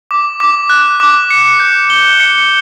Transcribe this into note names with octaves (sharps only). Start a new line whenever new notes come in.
D6
D6
F#6
D6
C#7
G6
G7
C#7